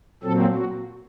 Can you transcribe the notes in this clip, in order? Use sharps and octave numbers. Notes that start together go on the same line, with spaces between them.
A#2 F#3 C4 A4
F#4